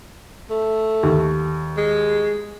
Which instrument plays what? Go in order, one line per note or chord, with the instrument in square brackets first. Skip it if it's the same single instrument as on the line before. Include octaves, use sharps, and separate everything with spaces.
[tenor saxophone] A3
[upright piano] D#2
[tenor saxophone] G#3